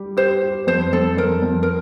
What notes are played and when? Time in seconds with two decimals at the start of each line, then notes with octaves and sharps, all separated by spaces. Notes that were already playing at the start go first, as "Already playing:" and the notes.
Already playing: G3 G4
0.17 G4 C5
0.42 G4
0.67 F2 C5
0.92 F2 A4
1.17 F2 A#4
1.42 F2
1.63 A#4